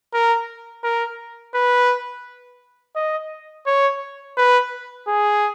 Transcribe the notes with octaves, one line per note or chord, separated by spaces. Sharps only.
A#4
A#4
B4
D#5
C#5
B4
G#4